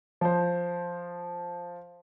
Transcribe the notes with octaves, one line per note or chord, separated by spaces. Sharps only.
F3 C5